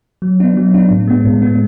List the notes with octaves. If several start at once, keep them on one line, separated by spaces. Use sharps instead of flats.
F#3
B3 D4
F#3
B3 D4
A2
G#3 B3
A2
G#3 B3